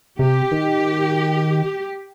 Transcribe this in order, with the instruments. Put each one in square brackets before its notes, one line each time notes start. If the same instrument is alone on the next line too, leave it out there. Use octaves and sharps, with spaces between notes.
[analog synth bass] C3 [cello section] G4
[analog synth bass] D#3